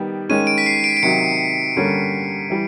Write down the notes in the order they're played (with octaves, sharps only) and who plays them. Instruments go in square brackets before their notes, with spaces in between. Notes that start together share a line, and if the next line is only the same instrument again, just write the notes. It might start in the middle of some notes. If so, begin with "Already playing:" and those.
Already playing: [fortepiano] D#3 G3 B3
[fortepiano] D#3 G#3 C#4 [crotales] D#7
[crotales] D7
B6
C7
D7
D7
[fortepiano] C3 D#3 F#3 [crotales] C#7
[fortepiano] G2 D3 G3 A#3 C#4
E3 G3